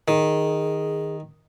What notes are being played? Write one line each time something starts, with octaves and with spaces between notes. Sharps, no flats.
D#3 G#4